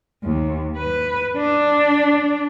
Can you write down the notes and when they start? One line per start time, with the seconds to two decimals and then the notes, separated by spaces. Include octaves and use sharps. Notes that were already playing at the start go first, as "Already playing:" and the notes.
0.24 D#2
0.78 B4
1.38 D4